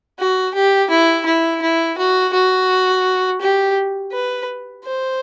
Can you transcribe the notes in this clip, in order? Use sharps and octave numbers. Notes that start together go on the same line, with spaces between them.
F#4
G4
E4
E4
E4
F#4
F#4
G4
B4
C5